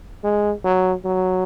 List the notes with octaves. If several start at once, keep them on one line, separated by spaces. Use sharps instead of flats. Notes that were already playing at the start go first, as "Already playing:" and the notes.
G#3
F#3
F#3